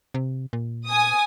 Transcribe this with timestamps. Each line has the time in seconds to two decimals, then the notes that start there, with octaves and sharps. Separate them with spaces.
0.14 C3
0.53 A#2
0.86 G#5 D#6